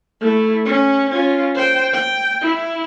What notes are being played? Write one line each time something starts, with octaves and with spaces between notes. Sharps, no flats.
A3 E4
C#4
C#4 F4
C5 G5
G5
E4